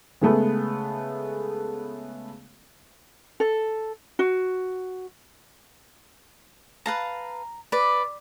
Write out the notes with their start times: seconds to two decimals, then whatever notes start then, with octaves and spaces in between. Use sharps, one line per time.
0.21 C#3 G#3 A3 B3
3.40 A4
4.19 F#4
6.86 B4 F5 A5 A#5
7.72 B4 D5